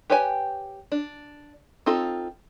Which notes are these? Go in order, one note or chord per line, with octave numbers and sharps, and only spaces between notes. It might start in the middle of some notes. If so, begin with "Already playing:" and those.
G4 B4 C#5 G5 G#5
D4
C4 D#4 F4 A4